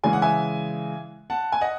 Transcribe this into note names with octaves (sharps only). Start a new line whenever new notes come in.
C#3 E3 G#3 G#5
F#5
E5 G#5
F#5 A5
G#5
D#5 F#5